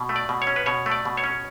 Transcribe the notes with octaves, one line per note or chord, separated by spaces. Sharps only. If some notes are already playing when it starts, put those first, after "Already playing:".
Already playing: B2
A3
D5
B2
C#5
C#4
B4
B2 C#5
A3
D5
B2
C#5
C#4